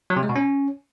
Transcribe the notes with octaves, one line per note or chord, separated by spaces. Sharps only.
F#3
C3
G#3
B2
C#4